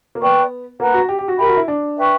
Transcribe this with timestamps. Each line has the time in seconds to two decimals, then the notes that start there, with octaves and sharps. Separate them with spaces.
0.15 A#3
0.21 B3 B4 D5 G5 C#6
0.80 A#3 B4 F#5 A#5
0.94 F#4
1.09 G4
1.19 G4
1.28 F#4
1.38 G4 A#4 E5 B5
1.48 F#4
1.57 E4
1.68 D4
1.97 B4 E5 G5 C#6